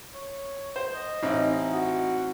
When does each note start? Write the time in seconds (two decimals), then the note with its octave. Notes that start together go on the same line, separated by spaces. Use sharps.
0.14 C#5
0.76 C5
0.93 D#5
1.23 A1 C4 D#4 E4
1.70 F#4